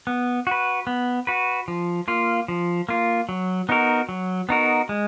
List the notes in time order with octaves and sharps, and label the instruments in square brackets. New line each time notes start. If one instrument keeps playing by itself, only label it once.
[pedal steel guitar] B3
F#4 B4
B3
F#4 B4
F3
A#3 F4
F3
A#3 F4
F#3
B3 D#4 F#4 A#4
F#3
B3 D#4 F#4 A#4
G#3